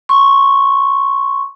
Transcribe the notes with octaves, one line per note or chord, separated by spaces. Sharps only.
C6 C#6